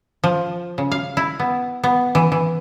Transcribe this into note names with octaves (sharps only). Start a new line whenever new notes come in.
F3
C#3
F5
E4
B3
B3
E3
E3